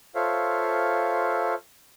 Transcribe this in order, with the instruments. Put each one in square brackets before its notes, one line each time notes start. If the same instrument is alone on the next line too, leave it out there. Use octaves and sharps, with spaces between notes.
[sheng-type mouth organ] F4 A4 C5 C#5 E5 F5